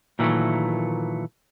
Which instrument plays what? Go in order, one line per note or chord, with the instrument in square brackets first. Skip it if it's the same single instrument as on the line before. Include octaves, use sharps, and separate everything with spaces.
[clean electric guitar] A#2 D#3 E3 F#3 A3